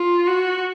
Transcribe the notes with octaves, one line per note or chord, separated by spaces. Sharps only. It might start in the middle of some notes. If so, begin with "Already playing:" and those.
Already playing: F4
F#4